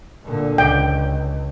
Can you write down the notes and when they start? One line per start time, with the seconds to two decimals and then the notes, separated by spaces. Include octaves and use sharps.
0.24 A#2 D3
0.58 C#2 G5